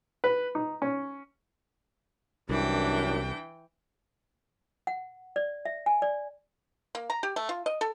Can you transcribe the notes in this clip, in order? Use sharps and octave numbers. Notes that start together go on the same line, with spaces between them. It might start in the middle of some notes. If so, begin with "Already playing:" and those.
B4
D#4
C#4
C2 F#2 E3 D4 G5
F#5
D5
E5
G#5
D5
A#3
A#5
G4
A3
F4
D#5
A4